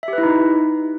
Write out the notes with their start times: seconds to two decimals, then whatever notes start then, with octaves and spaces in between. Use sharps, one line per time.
0.03 E5
0.08 G4
0.13 B4
0.18 E4
0.23 D#4